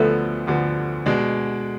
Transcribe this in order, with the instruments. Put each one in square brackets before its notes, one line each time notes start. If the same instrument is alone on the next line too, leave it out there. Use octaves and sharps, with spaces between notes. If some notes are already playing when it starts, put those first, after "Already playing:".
Already playing: [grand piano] D2 D3 F3 B3 [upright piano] A3
[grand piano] D2 D3 F3 B3
B2 G#3 D4